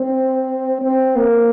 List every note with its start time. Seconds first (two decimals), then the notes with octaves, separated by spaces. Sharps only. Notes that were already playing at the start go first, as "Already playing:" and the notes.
Already playing: C4
0.82 C4
1.16 A#3